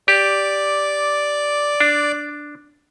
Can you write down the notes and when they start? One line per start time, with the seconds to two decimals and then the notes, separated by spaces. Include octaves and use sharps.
0.08 G4 D5 D6
1.80 D4